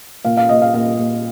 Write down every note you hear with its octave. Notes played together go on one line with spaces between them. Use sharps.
A#2 F5
F5
A#2 D#5
F5
A#2 F5
A#2